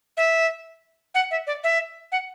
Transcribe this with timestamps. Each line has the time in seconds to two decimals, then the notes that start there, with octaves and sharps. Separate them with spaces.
0.17 E5
1.15 F#5
1.31 E5
1.47 D5
1.64 E5
2.12 F#5